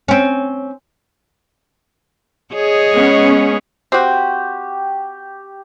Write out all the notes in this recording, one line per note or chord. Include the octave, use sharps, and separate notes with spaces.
C4 C#4
G#4 C#5 D#5
G#3 B3 C#4
C4 F#4 G4 G5